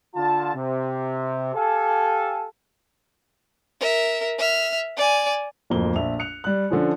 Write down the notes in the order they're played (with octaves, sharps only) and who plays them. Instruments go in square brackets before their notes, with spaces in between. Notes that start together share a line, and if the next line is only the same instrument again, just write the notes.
[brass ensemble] D3 F4 A5
C3
G4 A4 F5 G#5
[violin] A#4 E5
E5 F6
D5 G#5
[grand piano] D1 F2 F3 A#3 G7
A#1 E5 F7
F#6 C#7 F7
G3 F#6
D3 F3 C#4